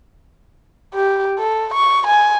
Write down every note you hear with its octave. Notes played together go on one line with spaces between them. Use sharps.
G4
A4
C#6
G#5